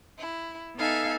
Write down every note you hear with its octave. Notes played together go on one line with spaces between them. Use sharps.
E4
B3 D#4 A4 E5 F5 G#5